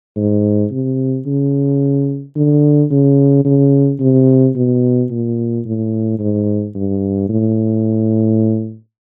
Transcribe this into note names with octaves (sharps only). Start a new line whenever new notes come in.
G#2
C3
C#3
D3
C#3
C#3
C3
B2
A#2
A2
G#2
G2
A2